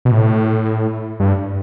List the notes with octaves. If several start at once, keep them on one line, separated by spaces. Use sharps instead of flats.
B2
A2
G2